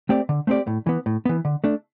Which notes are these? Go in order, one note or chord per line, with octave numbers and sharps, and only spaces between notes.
A3 C4 G4 D5
D3
A3 C4 G4 D5
A2
E3 B3
A2
E3 B3
D3
A3 D4